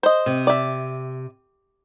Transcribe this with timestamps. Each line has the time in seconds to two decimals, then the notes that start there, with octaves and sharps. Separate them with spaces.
0.03 C5 D#5
0.26 C3
0.47 D5 E5